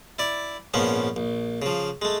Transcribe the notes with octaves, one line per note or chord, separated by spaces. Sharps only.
E4 D5
A#1 G#2 F3 B3 C#4
A#1
C#3 F3
G#3 A3